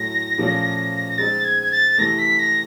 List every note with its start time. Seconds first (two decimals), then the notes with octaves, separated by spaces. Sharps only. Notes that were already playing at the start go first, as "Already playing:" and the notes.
Already playing: A2 F#3 A3 A#6
0.38 A#2 F3 A3 C#4
1.09 A#6
1.18 G#3 C4 D#4 A6
1.45 G#6
1.63 G#6
1.72 A6
1.98 C3 E3 A3 A#6
2.19 B6
2.39 A#6